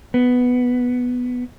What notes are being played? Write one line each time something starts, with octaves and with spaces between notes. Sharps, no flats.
B3